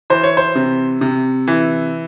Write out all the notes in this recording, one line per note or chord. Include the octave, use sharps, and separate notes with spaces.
E3 C5
C#5
C5
C3
C3
E3